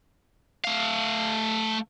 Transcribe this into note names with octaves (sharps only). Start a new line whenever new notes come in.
A3 F5